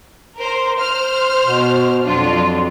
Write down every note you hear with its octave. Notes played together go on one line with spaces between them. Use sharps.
A#4 C5
C5 F6
B2
F2 F#3 D4 F4